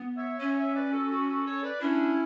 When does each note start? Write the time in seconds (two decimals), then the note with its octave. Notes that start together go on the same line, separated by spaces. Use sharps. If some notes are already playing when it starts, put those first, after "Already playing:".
Already playing: B3
0.16 C#5 E5
0.40 C#4 C#5 E5
0.57 C#5 E5
0.75 B4 D5
0.92 F#4 A4
1.10 F#4 A4
1.27 F#4 A4
1.45 A4 C#5
1.63 B4 D5
1.81 C#4 D4 E4